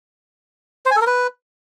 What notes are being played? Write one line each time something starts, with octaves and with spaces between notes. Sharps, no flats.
C5
G#5
A4
A#4
B4